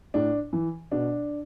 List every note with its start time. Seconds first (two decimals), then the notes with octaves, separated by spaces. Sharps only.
0.14 A2 D4
0.53 E3
0.91 B2 D4